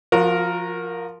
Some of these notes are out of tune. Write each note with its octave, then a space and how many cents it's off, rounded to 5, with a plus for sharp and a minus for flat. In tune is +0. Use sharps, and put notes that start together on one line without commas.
F3 +0 F#4 -30 A#4 +0